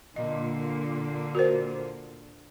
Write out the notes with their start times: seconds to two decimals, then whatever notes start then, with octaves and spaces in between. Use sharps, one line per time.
0.16 A#2 D3 A#3 D#5
1.35 F#4 A#4 C5